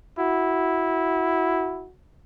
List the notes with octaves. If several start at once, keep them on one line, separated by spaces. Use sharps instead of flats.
E4 F#4